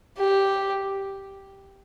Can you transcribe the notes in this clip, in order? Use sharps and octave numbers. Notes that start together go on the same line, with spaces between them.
G4